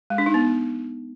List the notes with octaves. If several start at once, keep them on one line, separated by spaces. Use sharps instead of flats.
G#3
D4
D#4
B3